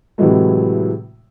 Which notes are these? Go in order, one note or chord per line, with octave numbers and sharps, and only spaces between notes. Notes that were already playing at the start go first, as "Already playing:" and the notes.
A2 C3 E3 F#3 G#3 A3